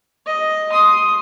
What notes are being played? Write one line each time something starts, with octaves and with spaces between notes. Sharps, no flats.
D#5
C6 D#6